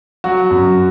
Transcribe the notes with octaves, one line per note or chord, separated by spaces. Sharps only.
F#3 F#4
F#2